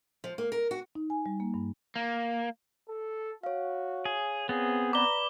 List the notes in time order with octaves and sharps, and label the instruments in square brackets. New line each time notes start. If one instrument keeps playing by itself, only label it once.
[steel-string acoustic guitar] F3
A#3
A#4
F#4
[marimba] D#4
G#5
G3
A#3
G2
[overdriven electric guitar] A#3
[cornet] A4
[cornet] F#4 [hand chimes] C#5 F5
[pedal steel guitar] G#4
[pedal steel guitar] B3 C4 [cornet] G#4
[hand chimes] B4 D5 B5 [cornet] A#5 [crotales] D6 G7